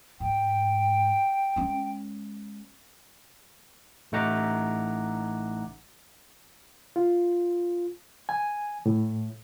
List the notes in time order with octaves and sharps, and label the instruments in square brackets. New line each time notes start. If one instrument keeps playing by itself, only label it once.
[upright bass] G#2 [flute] G5
[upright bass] G#3 C#4
[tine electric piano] A1 A3 D#4 F#5 A#5 D6
[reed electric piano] F4
G#5
A2